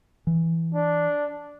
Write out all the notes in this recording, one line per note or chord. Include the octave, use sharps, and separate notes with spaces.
E3
D4